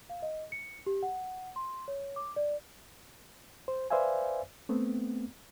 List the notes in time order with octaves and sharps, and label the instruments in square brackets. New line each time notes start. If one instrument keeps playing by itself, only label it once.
[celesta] F5
D#5
C#7
G4
F#5
C6
C#5
D6
D5
[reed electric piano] C5
B4 C5 D5 E5 F5 G#5
A3 B3 C4